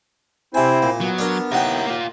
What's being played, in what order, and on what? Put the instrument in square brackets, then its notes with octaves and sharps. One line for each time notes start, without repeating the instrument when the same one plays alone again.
[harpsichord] C3 G#5 [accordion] C4 E4 C5
[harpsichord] A#2
[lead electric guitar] F#3 [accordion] B3
[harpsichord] D4 A#4
[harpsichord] D#2 F#5 G5 [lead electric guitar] E4 A#4
[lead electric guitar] A#3 F4